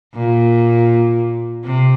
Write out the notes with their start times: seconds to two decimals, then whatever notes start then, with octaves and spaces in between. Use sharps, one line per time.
0.14 A#2
1.64 C3